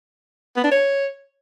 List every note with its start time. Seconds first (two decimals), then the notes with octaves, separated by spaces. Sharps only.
0.56 B3
0.64 D4
0.71 C#5